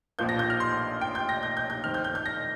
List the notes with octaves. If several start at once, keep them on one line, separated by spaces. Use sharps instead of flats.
A#1 A#2 F3 A#3 G6
A#6
G6
F6
C6
G5
G6
A#6
G6
G6
G6
F2 D#3 C4 F6
G6
G6
G6
A#6